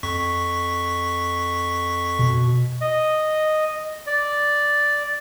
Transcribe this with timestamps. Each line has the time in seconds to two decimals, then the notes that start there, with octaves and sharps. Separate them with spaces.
0.03 F2 C#6 B6
2.19 B2
2.81 D#5
4.07 D5